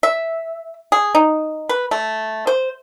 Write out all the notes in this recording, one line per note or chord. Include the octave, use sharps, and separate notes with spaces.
E5
G#4
D#4
B4
A3
C5